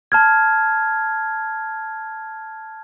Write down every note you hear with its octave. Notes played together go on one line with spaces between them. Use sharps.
A5 F6 G#6